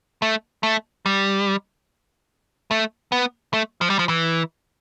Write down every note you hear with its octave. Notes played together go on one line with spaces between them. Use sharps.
A3
A3
G3
A3
B3
A3
F3
G3
F3
E3